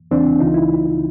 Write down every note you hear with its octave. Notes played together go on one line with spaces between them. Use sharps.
E2 C#3 E3 C4 D4
C#2 C#3 E3 D#4 F4
E4